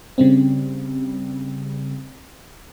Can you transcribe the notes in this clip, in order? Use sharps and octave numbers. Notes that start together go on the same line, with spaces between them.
C#3 G3 C4